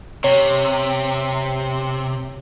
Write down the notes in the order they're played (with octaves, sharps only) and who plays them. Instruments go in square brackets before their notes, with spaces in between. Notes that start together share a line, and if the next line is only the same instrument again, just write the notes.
[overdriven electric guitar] C3 [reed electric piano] C#5